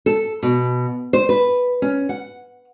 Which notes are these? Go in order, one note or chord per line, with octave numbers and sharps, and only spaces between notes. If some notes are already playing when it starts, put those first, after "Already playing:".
A4
B2
C5
B4
C#4
F#5